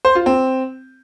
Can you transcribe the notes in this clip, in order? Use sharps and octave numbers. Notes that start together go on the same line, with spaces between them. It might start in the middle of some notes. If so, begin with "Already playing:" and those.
C5
F4
C4